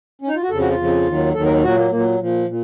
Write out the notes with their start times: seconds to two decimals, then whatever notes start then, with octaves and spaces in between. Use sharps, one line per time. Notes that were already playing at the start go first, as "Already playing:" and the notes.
0.22 C#4
0.28 D#4
0.35 F4
0.42 F#4
0.49 F2 C#3 F3 A4
0.60 F#4
0.69 F4
0.78 F2 C#3 F3
1.06 D#2 D#3 F#3
1.34 D#2 D#3 F#3 A4
1.44 A#4
1.62 A#2 F#3 F#4
1.76 A#3
1.91 A#2 F#3 A#3
2.19 A#2 F3
2.47 A#2